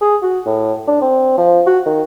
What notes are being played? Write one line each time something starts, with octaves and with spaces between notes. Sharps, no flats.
G#4
F#4
A2
D4
C4
F3
F#4
D#3